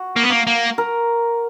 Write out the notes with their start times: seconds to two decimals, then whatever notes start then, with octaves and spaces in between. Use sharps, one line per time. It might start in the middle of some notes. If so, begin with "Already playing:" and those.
Already playing: F#4
0.16 A#3
0.23 B3
0.30 A#3
0.47 A#3
0.78 A#4